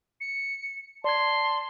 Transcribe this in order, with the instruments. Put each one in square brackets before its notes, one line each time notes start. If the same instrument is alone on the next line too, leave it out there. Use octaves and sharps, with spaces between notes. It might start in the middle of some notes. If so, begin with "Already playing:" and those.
[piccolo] C#7
[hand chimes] D5 G#6 [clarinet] A5 [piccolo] C6